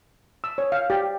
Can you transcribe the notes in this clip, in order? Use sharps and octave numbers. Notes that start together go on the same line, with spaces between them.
E6
C#5
F5
G4